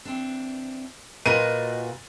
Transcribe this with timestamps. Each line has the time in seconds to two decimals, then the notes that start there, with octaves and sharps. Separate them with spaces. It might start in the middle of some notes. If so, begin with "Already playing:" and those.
0.05 E3 C4 D4
1.26 A#2 F4 F#4 A#4 B4 D#5 D#7